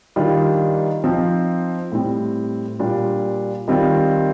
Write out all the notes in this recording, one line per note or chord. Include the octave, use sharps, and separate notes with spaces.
D#3 G3 D4 F4
F3 C4 D#4
A2 G3 C4
A#2 G3 D4 F4
D#3 G3 C4 F4